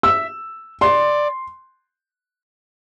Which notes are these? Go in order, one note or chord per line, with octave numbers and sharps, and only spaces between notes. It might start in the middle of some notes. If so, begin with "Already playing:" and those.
E5 E6
D5 C6